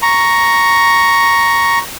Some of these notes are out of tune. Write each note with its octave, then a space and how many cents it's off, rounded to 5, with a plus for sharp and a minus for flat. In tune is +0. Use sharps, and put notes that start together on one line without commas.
A#5 +0 C#6 +0